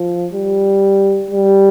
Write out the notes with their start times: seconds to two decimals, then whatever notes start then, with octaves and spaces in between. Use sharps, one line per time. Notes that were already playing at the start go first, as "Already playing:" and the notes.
Already playing: F3
0.33 G3
1.31 G3